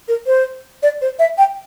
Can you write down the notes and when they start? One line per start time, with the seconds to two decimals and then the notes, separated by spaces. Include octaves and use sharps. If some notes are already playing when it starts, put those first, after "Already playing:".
0.08 A#4
0.27 C5
0.83 D5
1.01 C5
1.19 E5
1.38 G5